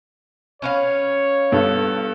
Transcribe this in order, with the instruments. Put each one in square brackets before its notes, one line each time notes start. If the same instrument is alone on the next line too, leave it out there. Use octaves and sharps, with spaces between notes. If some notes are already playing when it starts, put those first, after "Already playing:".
[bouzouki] C#4 B4 F5 [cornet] C#5
[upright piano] G2 B3 [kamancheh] A4